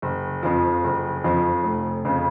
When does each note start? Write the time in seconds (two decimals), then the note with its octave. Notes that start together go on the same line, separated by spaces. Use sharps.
0.02 F#1
0.43 F2 F3
0.84 F#1
1.24 F2 F3
1.64 F1
2.05 F2 C#3